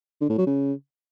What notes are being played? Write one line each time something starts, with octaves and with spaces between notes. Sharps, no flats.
D3
A2
F#3
C#3